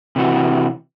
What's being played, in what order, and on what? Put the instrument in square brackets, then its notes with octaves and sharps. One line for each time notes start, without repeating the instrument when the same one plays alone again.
[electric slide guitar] C3 E3 F#4